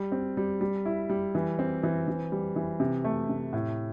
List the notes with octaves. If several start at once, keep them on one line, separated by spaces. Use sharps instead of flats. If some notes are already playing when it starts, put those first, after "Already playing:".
Already playing: G3
C4
G3
G3
E4
G3
E3
C4
E3
E3
G3
E3
C3
A3
C3
A2